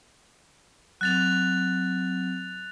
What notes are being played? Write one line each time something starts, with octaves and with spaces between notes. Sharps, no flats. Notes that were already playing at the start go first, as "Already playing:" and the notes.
F#3 C4 F#6 A6 F7